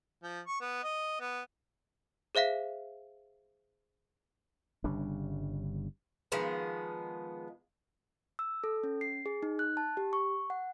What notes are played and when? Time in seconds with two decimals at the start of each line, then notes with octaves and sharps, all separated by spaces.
0.23 F3
0.47 C#6
0.61 B3
0.84 D#5
1.20 B3
2.35 G#4 C5 E5 F5 B6
4.84 G1 C#3 G3 D4
6.32 D#3 F3 G#3 B3
8.39 E6
8.64 A4
8.83 C#4
9.01 C7
9.26 G#4
9.43 D#4
9.59 F#6
9.77 A5
9.97 G4
10.13 C#6
10.50 F#5